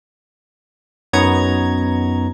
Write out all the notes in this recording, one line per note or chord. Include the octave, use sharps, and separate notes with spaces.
F#2 B3 D#4 C#5 A#5 G#6